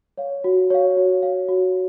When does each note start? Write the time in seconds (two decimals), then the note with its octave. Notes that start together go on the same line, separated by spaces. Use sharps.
0.18 C#5 F5
0.44 F#4
0.70 C#5 F5
0.97 F#4
1.23 C#5 F5
1.48 F#4